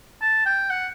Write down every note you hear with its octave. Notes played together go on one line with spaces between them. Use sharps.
A5
G5
F#5